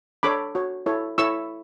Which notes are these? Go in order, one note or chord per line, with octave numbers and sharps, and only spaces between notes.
D4 A4 C#5 B5 D6
F#4 C#5
E4 A4 C#5
E4 A4 C#5 C#6 E6